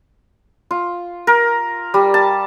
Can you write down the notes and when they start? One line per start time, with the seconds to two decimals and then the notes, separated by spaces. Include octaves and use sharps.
0.71 F4
1.27 A#4
1.94 G3
2.14 A5